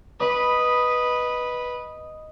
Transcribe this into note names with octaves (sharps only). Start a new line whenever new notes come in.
B4 D#5 B5